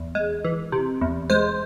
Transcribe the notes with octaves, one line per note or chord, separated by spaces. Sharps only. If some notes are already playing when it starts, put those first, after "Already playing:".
Already playing: E2
G#3
E3
C3
E2
G#3 C5